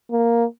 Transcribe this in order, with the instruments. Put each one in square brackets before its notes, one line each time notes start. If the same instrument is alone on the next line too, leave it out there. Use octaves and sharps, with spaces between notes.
[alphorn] A#3